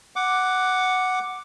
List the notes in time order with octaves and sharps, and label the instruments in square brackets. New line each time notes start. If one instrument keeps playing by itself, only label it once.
[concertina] F#5 D6